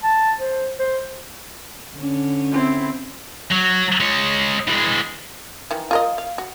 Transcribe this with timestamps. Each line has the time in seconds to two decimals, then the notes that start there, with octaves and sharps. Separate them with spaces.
0.03 A5
0.39 C5
0.79 C5
1.97 D3 C#4
2.52 C4 E4
3.52 F#3
4.01 G#3 C#5
4.68 E3 G#3
5.71 D#3 E3
5.91 F4 A#4 D#5
6.18 F5
6.38 F#4